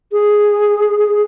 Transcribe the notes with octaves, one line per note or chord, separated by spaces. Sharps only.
G#4